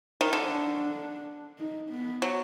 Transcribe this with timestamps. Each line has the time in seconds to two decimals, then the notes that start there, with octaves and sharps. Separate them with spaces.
0.21 D#3
0.32 D3 D4
1.59 D#4
1.90 B3
2.22 F#3